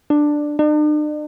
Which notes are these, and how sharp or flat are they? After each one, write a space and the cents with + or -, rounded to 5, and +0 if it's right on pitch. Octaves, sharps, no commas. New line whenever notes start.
D4 +10
D4 +45